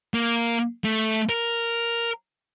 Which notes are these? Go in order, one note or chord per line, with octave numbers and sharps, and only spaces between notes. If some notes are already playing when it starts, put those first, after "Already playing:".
A#3
A3
A#4